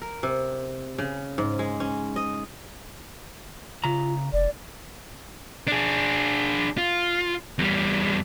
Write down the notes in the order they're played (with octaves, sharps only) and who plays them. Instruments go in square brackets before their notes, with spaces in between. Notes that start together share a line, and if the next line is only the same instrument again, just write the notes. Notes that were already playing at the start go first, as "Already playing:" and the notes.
[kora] A#4
C3
C#3
G#2
G#3
C#4
D#5
[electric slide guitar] C#3 A#5 [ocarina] F4
[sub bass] F1 [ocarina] D5
[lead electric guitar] D4 G#4
F4
E2 G3